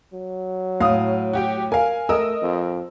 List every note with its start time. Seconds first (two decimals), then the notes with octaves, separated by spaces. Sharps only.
0.13 F#3
0.81 A2 F5 D#6
1.33 F#4 G4 G5
1.72 A#4 F5 G#5
2.09 A3 A#4 D#5 D#6 E6
2.42 F2